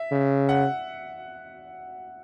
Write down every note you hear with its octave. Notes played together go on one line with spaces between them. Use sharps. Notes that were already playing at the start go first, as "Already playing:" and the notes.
Already playing: E5
C#3
F#5